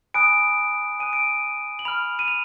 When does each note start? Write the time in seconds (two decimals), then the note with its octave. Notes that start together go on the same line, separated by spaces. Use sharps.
0.14 G#5 B5 D#6 F#6 D7
1.00 G#5 D#6 F#6 D#7
1.13 D7
1.27 D#7
1.79 F#7
1.85 B5 F6 F7
2.19 D#7
2.28 F7